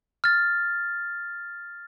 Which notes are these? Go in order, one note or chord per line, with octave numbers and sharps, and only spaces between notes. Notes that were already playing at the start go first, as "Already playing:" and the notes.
F6 A6